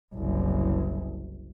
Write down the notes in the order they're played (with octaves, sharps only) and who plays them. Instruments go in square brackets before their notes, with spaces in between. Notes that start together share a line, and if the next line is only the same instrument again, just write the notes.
[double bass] F#1 C2